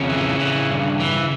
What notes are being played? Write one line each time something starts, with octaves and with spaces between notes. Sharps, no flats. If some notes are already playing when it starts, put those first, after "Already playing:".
Already playing: F2 C#3 C#4
E3
E3
G2
E3